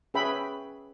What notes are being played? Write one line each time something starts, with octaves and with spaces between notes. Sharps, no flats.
C#4 G#4 B4 E5 G5 B5